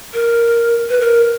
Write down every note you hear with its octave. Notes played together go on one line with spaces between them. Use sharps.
A#4
B4
A#4